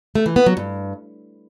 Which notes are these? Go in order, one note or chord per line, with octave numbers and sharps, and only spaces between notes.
A3
E3
B3
F#3
G2